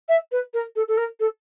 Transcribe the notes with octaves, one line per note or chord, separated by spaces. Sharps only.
E5
B4
A#4
A4
A4
A#4
A4